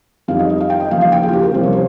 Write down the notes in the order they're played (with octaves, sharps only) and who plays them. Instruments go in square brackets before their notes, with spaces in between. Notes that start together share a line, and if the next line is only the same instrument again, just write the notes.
[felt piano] F2 D#3 G3 F5
D#5
D#5
F5
G5
D#5
D#2 C#3 F3 F5
F5
G5
G#4
F4
G4
A#4
C2 C3 F3 C5
C#5
C5